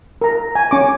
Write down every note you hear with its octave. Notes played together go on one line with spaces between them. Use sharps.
A#4 A#5
G#5
C#4 C#6 D6